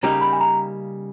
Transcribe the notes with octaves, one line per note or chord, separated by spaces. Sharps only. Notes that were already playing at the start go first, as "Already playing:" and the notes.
C#3 G3 A#3 D#4 G4 A#5
B5
G#5
A#5